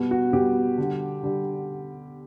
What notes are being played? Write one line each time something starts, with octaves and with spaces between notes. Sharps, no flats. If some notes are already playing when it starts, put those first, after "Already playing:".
Already playing: B2 G3
F#4
B2 G3 G4
D3 G3
D3 G3